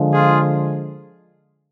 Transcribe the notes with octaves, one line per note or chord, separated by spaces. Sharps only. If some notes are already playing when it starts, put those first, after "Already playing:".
Already playing: D3 F3 G#3
F4 G#4